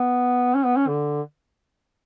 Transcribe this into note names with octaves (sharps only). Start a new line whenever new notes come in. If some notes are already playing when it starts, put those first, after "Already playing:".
Already playing: B3
C#4
B3
C#4
D3